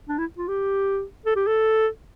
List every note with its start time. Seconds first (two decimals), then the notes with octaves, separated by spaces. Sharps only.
0.08 D4
0.18 E4
0.38 F4
0.48 G4
1.26 A4
1.36 G4
1.47 A4